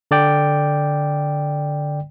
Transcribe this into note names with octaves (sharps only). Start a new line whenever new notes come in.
D3 D5 G5